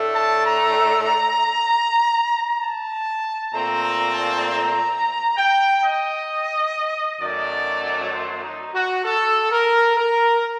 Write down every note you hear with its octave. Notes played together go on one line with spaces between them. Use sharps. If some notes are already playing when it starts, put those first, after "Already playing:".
Already playing: A2 A3 D4
A5
A#5
A5
A#2 A3 C4 A#5
A#5
A5
A#5
G5
D#5
F#2 D#3 F#3 A3 D5
C5
D#4
F#4
A4
A#4
A#4